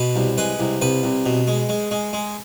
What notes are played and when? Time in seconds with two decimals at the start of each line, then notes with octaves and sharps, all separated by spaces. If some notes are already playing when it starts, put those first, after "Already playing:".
Already playing: B2 B4
0.16 C2
0.38 G#3 B4
0.59 C2
0.82 C2 B4
1.03 C2
1.26 B2
1.47 G#3
1.69 G#3
1.91 G#3
2.13 G#3